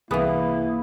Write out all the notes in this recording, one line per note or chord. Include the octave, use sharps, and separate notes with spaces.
C2 E3 A#3 B3 E4 G#4 D#6